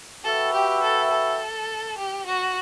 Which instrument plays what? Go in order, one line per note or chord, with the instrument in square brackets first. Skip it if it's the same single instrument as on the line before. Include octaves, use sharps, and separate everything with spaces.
[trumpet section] F#4 B4 E5 G5 [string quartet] A4
[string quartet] G4
A4
A4
G4
F#4